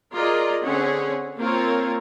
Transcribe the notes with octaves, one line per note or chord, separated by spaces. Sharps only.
F4 G#4 A#4 D5 D#5
D3 C4 C#4 G#4 C#5 F#5
A#3 C4 F4 A#4 C#5